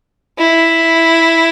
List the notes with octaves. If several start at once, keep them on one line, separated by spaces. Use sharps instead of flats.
E4